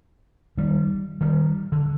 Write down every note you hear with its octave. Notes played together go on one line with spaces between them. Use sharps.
D#3 G3
D#3 G3
D3